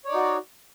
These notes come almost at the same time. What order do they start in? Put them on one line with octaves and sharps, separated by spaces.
C#5 D5 D#4 F#4